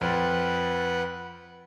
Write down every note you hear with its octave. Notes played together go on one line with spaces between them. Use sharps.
F2 F3 B4 F#5